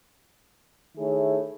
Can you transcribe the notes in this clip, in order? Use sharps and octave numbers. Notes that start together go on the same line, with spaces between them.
D#3 A3 E4 G#4 C#5